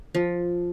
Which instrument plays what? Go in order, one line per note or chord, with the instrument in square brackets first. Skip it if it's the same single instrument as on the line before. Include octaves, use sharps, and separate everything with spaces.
[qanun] F3